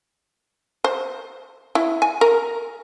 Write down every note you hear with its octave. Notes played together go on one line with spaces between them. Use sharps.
C5
E4
G#5
A#4